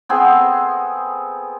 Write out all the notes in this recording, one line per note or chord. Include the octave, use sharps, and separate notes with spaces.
B3 C4 G#4 A4